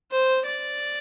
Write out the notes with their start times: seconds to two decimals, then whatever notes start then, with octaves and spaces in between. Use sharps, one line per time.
0.11 C5
0.45 D5